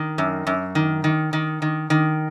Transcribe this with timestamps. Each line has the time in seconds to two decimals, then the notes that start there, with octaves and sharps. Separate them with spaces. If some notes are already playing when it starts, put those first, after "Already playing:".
Already playing: D#3
0.18 F#2
0.47 F#2
0.75 D#3
1.04 D#3
1.33 D#3
1.62 D#3
1.90 D#3